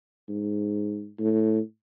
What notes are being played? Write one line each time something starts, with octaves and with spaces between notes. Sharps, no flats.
G#2
A2